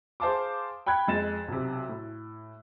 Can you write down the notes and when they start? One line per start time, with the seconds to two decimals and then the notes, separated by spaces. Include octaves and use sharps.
0.20 G#4 C5 F5 A5 C6 D6
0.86 G5 B5 F#6 G#6
1.08 F2 G#3 A6 E7
1.48 B1 C3
1.89 A2